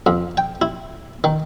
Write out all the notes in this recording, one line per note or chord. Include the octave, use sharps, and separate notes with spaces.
F2
G5
E4
D#3